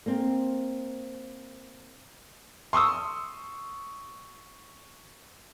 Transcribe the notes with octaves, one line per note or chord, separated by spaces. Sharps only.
A#3 C4
C6 C#6 D#6 E6